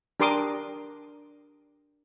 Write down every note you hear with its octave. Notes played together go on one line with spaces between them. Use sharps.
D4 G4 A#4 C6 D6 D#6